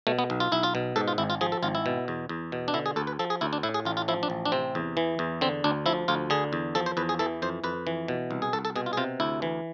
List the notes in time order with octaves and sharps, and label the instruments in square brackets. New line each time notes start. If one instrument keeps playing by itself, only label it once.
[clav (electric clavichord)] B2 A3
B3
B1
F4
B1 E4
F4
B2
G#2 A4
F4
G#1 E4
F4
F3 G#4
A4
G#1 F4
E4
B2
E2
E2
B2
D4
D3 E4
G#4
D2 A4
B4
F3 A4
G#4
D2 E4
D4
A2 E4
G#4
A1 F4
F4
F3 E4
D4
A1
D4
C3 C4
E2
E3
E2
D3 C4
D2 D4
F3 E4
D2 F4
D3 G#4
E2
F3 A4
C5
E2 B4
G#4
E3 A4
F2 C5
F2 B4
E3
B2
C2
G#4
C2 A4
A4
B2 G#4
F4
G#4
C3 F4
D2 E4
E3